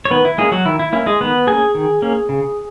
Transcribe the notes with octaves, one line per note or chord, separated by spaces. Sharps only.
C#5
D#3 B3 B4
E4
G#3 A#3 C#4 G#4
F#3 F#4
D#3 E4
E4
A#3 C#4 E4
G#3 G#4
D#3 B3 B4
A#3 C#4 G#4 G#5
D#3
A#3 C#4
C#3